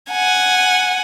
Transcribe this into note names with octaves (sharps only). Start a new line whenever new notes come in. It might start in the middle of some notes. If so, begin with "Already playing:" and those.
F#5 G#5